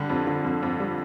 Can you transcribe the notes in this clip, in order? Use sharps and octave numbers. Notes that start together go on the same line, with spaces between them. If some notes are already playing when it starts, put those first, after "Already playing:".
Already playing: D3 G3
F2
D3
F2
F2
G3